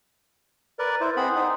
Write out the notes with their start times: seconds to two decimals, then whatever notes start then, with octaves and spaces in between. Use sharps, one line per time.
0.79 A#4 B4 D5
1.01 E4 C5
1.17 C4 G#4 F#5 B5
1.36 D#4 G#4 C5